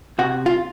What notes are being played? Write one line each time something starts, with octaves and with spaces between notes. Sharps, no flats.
C3 F#4
F4